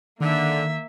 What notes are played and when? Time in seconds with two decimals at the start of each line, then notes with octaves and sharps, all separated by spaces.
0.21 D3 D#3 A#3 E5